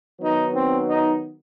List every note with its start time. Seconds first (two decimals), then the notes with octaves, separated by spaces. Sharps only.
0.20 D#3 F#3 B3 D#4
0.53 C4
0.87 D#4